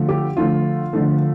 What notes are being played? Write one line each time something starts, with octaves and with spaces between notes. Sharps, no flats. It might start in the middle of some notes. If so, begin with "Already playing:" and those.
Already playing: D3 F3 A3
G4
D3 F3 A3 F4
D3 F3 A3